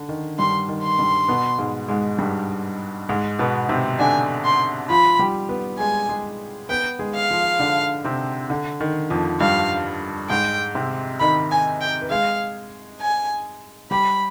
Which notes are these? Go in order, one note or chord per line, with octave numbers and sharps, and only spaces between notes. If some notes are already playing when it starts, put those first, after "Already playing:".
Already playing: D3
D#3
G2 G3 C6
D#3
C6
G2 G3
B2 B3
G#2 G#3
G#2 G#3
G2 G3
G#2 G#3
B2 B3
C3 C4
D3 D4 G#5
C6
F3 F4 B5
G3 G4
B3 B4
G#3 G#4 G#5
G#3 G#4
B3 B4 G5
G#3 G#4
F5
F3 F4
D3 D4
C3 C4
D3
D#3
F2 F3
G2 G3 F5
G#2 G#3 G5
C3 C4
D#3 D#4 B5
G#5
G5
B4
G#3 G#4 F5
G#5
G3 G4 B5